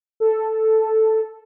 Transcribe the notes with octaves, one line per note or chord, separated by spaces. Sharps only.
A4